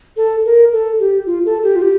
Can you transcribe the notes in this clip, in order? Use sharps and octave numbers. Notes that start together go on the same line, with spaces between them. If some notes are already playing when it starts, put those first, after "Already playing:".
A4
A#4
A4
G4
F4
A4
G4
F4
G4